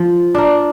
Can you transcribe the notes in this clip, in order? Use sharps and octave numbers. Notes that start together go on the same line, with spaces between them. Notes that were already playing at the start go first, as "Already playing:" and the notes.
Already playing: F3
D4 A#4